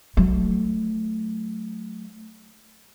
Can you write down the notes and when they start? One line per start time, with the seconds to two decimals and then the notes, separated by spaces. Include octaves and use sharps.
0.17 F#3 A3